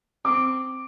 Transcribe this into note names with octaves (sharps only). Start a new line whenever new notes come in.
C4 D6